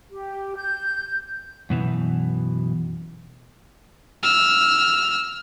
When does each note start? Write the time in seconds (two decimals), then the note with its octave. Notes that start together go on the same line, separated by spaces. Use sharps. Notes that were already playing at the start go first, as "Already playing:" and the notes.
0.11 G4
0.56 G6
1.70 F#2 B2 E3
4.23 E6 F6